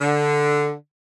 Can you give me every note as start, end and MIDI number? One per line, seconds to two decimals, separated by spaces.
0.01 0.73 50